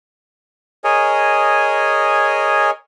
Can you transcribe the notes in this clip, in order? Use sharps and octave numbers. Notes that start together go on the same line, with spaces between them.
G#4 A#4 C#5 D#5 G#5